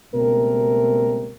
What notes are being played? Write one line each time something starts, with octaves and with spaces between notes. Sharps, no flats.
C#2 B2 G3 A3 C4 A#4